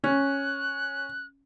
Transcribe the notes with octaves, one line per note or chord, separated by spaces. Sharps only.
C#4 F#6